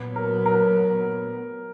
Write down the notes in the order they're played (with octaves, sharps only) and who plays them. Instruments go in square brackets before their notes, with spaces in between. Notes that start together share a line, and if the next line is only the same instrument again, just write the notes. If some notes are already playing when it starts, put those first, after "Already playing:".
Already playing: [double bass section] A#2 F#3 B3
[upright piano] A#4
A#4